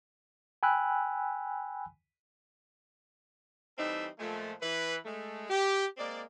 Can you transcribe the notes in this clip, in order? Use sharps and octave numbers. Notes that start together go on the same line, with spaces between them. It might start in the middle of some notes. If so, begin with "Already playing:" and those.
G5 G#5 B5 E6 F#6
E3 G3 C4 D#4 A4 E5
A#2 F3 G#3 A3
E3 B4
G#3 A3
G4
G#3 A#3 C4 D5